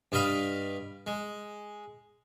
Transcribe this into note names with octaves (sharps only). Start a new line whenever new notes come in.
G2 G3 D#5 F5 B5
G#3